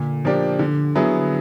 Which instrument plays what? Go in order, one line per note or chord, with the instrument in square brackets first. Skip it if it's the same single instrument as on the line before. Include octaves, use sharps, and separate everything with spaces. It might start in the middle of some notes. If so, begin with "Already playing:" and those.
Already playing: [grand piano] A#2 [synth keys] D3
[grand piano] F3 A#3 D4 G4
D3
F#3 B3 E4 G#4